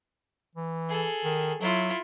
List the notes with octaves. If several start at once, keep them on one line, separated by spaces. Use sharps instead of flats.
E3
G#4 A4
D#3
F#3 E4 F4